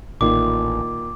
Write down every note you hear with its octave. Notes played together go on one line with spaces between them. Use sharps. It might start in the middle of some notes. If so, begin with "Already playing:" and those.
A1 A#2 D#3 F4 D6